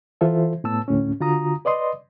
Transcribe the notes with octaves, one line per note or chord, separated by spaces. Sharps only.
E3 F4 A4 C5 E5
A2 B3 A5 E6
D2 A2 C#4
D3 F4 F#4 A#5 D#6
B4 D5 D#5 C6 D#6